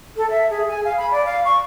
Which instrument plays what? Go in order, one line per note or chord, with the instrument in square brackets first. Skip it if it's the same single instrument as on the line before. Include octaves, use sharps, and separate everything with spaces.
[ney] A4
E5
G#4
G#5
F5
B5
D5
F5
C#6